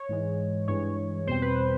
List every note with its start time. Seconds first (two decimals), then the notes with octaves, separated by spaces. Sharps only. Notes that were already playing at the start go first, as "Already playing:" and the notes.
Already playing: C#5
0.09 G#2 E3 G#3
0.68 G2 E3 G#3 C#5
1.27 E2 B2 G3 C4 C5
1.42 B4